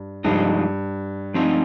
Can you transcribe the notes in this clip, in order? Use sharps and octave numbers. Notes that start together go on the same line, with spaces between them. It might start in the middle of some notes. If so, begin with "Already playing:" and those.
Already playing: G2
G2 C3 F3 G#3 D#4
F3 C4 D#4